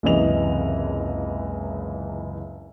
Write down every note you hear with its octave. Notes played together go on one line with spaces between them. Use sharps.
F#1 C#2 C3 E3 D#5 F7